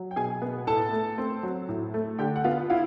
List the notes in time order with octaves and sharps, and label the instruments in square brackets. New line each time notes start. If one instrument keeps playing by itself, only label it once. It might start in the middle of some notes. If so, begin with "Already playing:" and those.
Already playing: [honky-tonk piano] F#3
[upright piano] G5
[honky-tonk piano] B2 [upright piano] G#4 G#5
[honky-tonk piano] B3
[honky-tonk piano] A2 [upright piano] A4 A5
[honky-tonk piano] A3
C4
F#3
A2
A3
[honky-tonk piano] D3 [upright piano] G4 G5
[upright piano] F#5
[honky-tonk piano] B3 [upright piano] F4 F5
[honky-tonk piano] E4 [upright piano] F4 F5